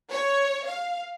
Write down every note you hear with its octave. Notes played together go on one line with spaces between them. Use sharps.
C#5
F5